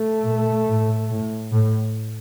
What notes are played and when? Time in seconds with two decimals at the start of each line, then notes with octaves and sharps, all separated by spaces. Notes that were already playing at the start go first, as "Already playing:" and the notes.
Already playing: A3
0.25 A#2
0.67 A2
1.10 A2
1.52 A2